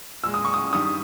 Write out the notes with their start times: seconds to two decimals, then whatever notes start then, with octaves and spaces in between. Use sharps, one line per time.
0.23 A#2 G#3 E6
0.34 D#6
0.45 C#6
0.54 D#6
0.73 G2 D#3 G3 D#6